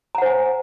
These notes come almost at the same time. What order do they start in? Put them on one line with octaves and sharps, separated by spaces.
A#5 F#5 C5 G#5